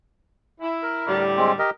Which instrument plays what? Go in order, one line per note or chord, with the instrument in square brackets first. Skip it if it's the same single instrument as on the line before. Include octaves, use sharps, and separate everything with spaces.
[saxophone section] E4
[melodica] A#4
[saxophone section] A2 D3 G3
[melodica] G#3 C4
G4 A#4 D#5